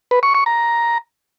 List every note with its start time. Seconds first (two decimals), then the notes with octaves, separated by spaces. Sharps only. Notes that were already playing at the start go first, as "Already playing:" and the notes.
0.11 B4
0.23 C#6
0.35 C#6
0.46 A#5